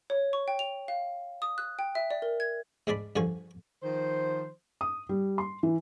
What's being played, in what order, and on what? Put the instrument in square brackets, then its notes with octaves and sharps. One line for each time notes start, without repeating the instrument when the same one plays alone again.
[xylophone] C#5
C#6
G5
F7
F5
D#6
F#6
G5
E5
D5
A#4
G#6
[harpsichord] G#2 G#3 D4 D5 B5
G2 D3 F3 G#5 C#6
[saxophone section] D#3 F3 C5
[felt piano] D#6
G3
C6
E3